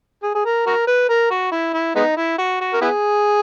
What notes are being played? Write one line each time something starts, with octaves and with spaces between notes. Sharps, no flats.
G#4
G#4
A#4
F#4 A#4
B4
A#4
F#4
E4
E4
G#3 B3 D#4
E4
F#4
F#4
A#4
B3 E4 G#4